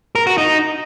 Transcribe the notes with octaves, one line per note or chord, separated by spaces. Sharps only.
A#4
F#4
D#4